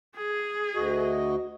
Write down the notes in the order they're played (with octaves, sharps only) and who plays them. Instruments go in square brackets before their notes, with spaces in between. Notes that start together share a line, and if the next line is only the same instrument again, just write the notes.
[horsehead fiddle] G#4
[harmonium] D2 F#4 D#5